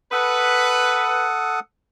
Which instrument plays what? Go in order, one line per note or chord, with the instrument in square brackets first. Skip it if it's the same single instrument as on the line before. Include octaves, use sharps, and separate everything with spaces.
[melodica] A4 F#5 D#6 [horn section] B4